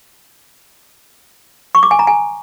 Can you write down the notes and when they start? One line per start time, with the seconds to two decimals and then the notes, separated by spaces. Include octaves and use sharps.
1.75 C#6
1.83 D6
1.91 G#5
1.99 A#5
2.07 G#5